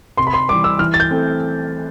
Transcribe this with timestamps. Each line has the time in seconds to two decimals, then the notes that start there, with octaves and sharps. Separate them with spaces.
0.17 C3 C6
0.27 B5
0.33 C6
0.49 G3 D6
0.53 E3
0.64 E6
0.79 E3 F6
0.94 A6
1.00 G6
1.11 A3 C4